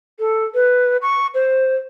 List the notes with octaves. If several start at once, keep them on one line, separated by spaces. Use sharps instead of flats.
A4
B4
C#6
C5